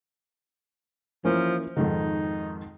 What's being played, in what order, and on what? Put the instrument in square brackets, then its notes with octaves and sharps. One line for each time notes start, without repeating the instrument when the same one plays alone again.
[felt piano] E3 A#3 C#4 [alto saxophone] F3
[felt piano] F2 G#2 D#3 [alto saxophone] D#4